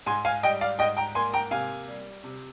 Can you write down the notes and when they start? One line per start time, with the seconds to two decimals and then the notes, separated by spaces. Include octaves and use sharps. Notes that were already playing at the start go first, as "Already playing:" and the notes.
0.06 G#2 G#5 C6
0.25 F5 G#5
0.43 G3 D#5 G5
0.61 D5 F5
0.79 G#2 D#5 G5
0.97 G5 A#5
1.15 A#3 G#5 C6
1.34 G5 A#5
1.51 C3 F5 G#5
1.88 G3
2.23 C3